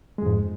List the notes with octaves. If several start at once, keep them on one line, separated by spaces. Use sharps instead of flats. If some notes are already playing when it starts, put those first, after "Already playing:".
F2 G#2 G#3